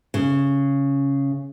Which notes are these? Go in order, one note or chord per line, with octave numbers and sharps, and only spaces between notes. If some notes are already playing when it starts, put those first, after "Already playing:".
C#3